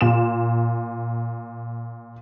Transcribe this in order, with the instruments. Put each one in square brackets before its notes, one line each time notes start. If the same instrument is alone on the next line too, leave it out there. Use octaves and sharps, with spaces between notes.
[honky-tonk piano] A#2 E7